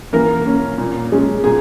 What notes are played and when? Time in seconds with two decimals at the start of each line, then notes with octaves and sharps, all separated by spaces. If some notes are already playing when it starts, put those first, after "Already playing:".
0.13 E3 A#3 A#4
0.45 A#3 C#4
0.78 A#2
1.12 G#3 C#4
1.44 A#2 G#4